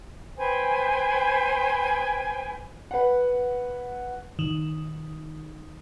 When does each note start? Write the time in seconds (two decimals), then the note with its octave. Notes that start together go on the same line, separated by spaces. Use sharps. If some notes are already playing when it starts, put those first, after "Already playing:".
0.37 B4 C5 G5 G#5
2.91 B4 F#5
4.39 D#3